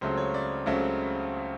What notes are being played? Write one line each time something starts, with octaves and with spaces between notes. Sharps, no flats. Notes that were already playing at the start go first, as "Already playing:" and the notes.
C#2 C#3 F#3 A3 C4 C5
C#5
D5
C#2 C#3 F#3 A3 C4